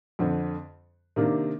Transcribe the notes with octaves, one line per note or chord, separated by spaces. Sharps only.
F2 D3 F3 C4
C3 D#3 A#3 D4